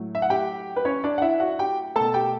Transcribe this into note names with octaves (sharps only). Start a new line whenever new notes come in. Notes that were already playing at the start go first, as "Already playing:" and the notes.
Already playing: A2 F#3 A3
E5
F#5
G4 G5
B4
C#4 C#5
D4 D5
F#5
E4 E5
F#4 F#5
G4 G5
B2 A3 A4 A5
G4 G5